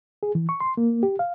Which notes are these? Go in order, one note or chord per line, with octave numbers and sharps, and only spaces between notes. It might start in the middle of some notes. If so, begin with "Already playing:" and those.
G#4
E3
C#6
C6
A#3
G4
F5